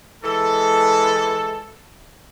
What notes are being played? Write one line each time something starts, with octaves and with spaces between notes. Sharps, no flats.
E3 G#3 A4